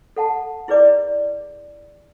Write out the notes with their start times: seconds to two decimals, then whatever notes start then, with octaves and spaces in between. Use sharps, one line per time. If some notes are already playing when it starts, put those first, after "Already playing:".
0.17 A4 F#5 A5
0.68 E4 G#4 B4 D5 D6